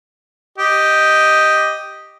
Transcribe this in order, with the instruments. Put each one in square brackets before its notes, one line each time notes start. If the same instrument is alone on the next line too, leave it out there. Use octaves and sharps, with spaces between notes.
[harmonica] G4 D#5